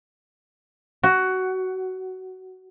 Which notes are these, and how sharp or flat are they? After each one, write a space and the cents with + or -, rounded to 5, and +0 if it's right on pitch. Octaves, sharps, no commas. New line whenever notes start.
F#4 +15